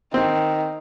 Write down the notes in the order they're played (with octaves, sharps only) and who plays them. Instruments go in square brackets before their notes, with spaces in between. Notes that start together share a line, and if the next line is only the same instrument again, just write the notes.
[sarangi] D#3 [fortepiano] C4